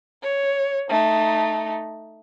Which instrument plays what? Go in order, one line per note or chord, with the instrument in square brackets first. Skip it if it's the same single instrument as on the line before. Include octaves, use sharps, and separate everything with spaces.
[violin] C#5
A3 D#4